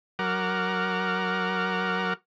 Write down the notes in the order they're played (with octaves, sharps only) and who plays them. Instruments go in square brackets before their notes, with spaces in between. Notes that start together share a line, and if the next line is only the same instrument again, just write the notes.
[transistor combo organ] F#3 A#4 F#5 D6 F6